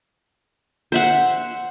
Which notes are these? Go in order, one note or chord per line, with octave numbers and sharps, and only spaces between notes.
C5 E5 F#5